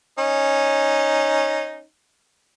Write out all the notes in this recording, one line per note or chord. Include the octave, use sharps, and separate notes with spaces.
C#4 D#4